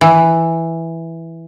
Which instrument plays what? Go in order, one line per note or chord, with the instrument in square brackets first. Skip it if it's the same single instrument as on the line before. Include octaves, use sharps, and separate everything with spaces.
[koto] E3